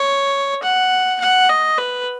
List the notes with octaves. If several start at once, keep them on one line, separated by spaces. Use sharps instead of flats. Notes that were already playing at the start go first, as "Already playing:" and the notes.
Already playing: C#5
F#5
F#5
D#5
B4